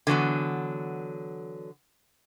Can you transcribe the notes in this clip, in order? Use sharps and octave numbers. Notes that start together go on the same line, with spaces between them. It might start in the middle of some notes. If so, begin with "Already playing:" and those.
D3 E3 F#3 B3